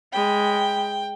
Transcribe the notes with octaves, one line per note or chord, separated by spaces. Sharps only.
G#3 G5 B5